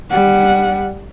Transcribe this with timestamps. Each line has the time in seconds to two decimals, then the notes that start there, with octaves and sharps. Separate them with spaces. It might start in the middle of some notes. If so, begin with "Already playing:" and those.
0.11 G3 F#5